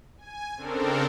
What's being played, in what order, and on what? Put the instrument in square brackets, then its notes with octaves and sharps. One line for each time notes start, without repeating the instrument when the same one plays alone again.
[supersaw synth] G#5
C#3 C4 D4 A4 A#4